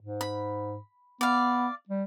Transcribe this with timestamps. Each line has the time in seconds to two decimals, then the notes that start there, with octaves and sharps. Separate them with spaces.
0.02 G#2
0.21 B5
1.21 B3 D5 F5
1.88 G3